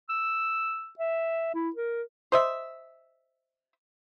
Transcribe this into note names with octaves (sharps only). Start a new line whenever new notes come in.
E6
E5
E4
A#4
C5 D#5 E5